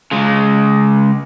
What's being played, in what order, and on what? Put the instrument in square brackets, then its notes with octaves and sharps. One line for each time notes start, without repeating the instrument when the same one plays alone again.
[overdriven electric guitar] C#3 G#3